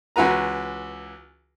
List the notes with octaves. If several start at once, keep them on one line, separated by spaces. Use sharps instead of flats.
C#2 E3 F#4 B4 A#5